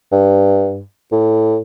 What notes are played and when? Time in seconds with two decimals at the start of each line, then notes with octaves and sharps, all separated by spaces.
0.12 G2
1.12 A2